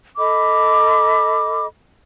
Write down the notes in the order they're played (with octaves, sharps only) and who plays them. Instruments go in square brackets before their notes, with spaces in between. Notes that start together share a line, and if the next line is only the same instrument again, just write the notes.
[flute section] A4 D#5 B5 D6